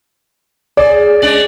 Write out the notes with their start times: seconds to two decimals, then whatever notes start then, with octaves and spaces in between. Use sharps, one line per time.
0.77 G#4 D5
1.22 G#3 C#4 D5